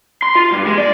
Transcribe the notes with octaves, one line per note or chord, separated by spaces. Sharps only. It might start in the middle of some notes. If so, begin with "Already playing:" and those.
C6
F4
G2
G#3
D5